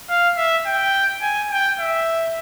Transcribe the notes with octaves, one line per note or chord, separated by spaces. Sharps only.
F5
E5
G5
G#5
G5
E5